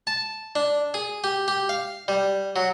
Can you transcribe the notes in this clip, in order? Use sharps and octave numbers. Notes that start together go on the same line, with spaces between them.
A5
D4
G#4
G4
G4
F5
G3
F#3